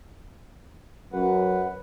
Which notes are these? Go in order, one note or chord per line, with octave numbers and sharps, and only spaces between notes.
F#2 B4 F#5